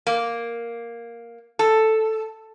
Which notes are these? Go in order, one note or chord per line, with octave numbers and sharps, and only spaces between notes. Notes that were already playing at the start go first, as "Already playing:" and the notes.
A#3
A4